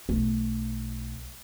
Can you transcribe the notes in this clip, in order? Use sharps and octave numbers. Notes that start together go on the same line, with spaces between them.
B1 A3